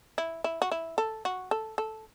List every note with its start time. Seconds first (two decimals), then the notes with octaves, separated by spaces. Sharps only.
0.18 E4
0.44 E4
0.62 F#4
0.72 E4
0.98 A4
1.25 F#4
1.51 A4
1.78 A4